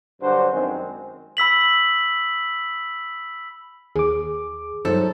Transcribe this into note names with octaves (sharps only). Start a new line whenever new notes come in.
G2 D3 F#3 D4 F#4 C5
F#2 D#3 G#3 C4
B5 E6 B6 F#7
D#2 G#4 D6
G2 F#3 D#4 A4 C5